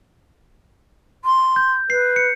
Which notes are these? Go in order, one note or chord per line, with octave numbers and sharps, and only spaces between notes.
C6
G6
B4 C7
C#7